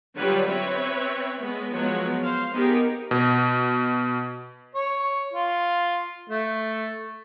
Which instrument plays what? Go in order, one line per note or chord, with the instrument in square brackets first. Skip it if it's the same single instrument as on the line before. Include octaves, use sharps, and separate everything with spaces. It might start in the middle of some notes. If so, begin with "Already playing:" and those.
[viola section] D3 F#3 G3 F4 B4 C#5
C4 B4 C#5 E5
G#3 B3
F3 F#3 G#3 B3 C#5
C5 F5
B3 D#4 G4 G#4 A#4
[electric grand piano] B2
[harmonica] C#5
F4
A3